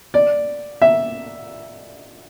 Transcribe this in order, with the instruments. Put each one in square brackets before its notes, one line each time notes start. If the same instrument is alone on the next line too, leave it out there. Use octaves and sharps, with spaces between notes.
[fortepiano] D5
E5